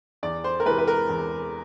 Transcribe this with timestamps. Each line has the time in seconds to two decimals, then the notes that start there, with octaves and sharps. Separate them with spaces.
0.23 E2 D5
0.44 C5
0.60 A#4
0.65 C3 E3 G#3 B4
0.78 B4
0.88 A#4
1.09 E2